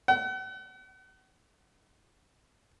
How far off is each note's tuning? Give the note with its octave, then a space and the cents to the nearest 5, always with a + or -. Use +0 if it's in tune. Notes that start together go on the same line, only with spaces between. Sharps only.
F#5 +40